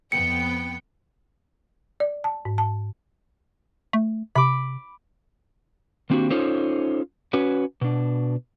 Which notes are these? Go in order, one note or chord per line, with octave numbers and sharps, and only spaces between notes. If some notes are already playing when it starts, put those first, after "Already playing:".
F2 B3 G5 C#7
D5
A5
G#2
A5
A3
C3 B5 D6
D#3 A#3 C4 D4 F#4 G4
C#4 D#4 F4 A4 C5 C#5
C#4 F#4 B4 C#5
B2 D4